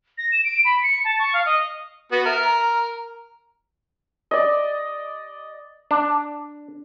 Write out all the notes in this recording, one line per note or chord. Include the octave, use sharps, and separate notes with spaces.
A#6
E7
D7
B5
C#7
A5
C#6
F5
D#5
B3 F#4
A#4 E5
A#5
D5 D#5
D4